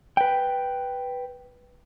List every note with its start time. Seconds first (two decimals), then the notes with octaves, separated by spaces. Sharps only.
0.17 B4 G5